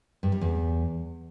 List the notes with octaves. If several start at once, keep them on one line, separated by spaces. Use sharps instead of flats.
G2
G3
E2